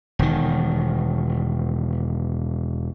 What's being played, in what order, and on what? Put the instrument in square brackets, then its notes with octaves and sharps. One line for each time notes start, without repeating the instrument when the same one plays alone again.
[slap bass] E1 D#3